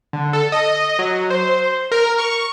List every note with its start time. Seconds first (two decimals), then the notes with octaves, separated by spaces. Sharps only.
0.13 D3
0.33 A4
0.52 D#5
0.99 F#3
1.30 C5
1.92 A#4
2.18 C#6